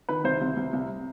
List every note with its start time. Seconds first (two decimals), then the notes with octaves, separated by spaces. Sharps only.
0.09 D#3 B4
0.24 C2 C5
0.41 C2
0.57 C2
0.73 C2